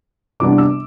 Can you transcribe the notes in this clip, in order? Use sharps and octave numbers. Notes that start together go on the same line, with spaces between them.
C3 E3 G3 B3 D4 D6
E6